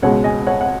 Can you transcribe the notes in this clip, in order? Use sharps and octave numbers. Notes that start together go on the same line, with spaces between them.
C#2 B2 G#3 C#5 F#5
D#5 G#5
C#5 F#5
F#5